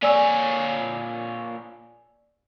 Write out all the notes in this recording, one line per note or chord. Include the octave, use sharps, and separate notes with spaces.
A#2 C#5 D5 G#5 E6